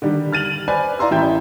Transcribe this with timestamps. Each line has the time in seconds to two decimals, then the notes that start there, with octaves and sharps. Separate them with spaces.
0.02 D3 D#3 G3
0.32 F6 A6 D#7 F7 F#7
0.68 B4 C5 D5 G#5
0.99 E4 D5 F5 A#5 C6 E6
1.11 A1 E4 E5 G5 G6